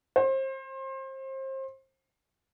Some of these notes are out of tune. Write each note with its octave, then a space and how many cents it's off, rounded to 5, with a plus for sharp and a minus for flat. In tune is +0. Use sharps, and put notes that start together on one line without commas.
C5 +30